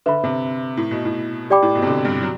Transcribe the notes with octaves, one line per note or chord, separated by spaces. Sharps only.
D3 B4 E5 B5
C3
A2
B2
A2
G4 D5 G5 B5 D6
A2
B2
C3
D3
G2
F#3